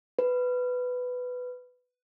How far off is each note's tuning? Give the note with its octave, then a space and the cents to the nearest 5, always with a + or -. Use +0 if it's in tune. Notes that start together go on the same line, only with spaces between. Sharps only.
B4 +10